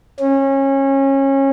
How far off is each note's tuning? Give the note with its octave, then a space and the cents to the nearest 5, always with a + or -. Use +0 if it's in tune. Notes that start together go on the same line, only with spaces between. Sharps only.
C#4 -25